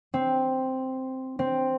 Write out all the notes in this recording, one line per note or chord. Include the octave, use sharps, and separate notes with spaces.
C4
C4